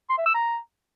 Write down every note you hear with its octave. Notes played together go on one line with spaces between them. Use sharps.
C6
E5
E6
A#5